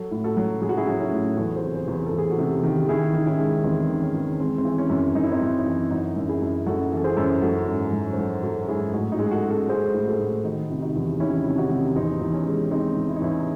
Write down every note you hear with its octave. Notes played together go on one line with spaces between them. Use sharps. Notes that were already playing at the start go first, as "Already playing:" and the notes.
Already playing: F#3 F#4 A4
A2
F#4 A4
F#3
F#3 G#4
F#4
E4 G#4
F#3
C#4 E4
A2
E2 F#4 A4
G#4 C5
C3
G#4 C5
E2
C5
A4
E2
G#4
F#4 A4
C3
D#3
D#3 E4 G#4
D#3
C#4 E4
G#3
E2 C4 D#4
D#3
C#4
E2
G#3 C4
C4
E3
C#4
F#2
F#2 D#4
E4
C4 D#4
F#2
E3
F#2 D#4 F#4
F#2
E4 G#4
F#2
F#2 F#4 A4
E3
A4
G#4 C5
F#2
F#3 F#4 A4
G#2
F#3
C5
F#3 F#4 A4
F#3 F#4 A4
G#2 E4 G#4
A2 D#4 F#4
D#4 F#4
G#3
G#4
F#4 A4
G#3
F#4 A4
G#3 G#4 C5
A2
F#4 A4
A2
D#3 D#4 F#4
C3
D#4 F#4
E2
D#3 C#4 E4
C3
D#4 F#4
C3
E2 C4 D#4
E2
C#4
G#3
G#3 C4 D#4
E2
E4
D#4
E2 C#4 E4